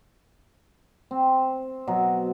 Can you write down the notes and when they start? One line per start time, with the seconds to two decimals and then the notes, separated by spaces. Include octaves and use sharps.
1.11 C4
1.87 B2 F#3